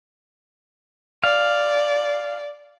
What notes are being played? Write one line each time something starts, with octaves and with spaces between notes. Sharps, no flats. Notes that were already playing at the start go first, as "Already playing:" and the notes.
D5 F5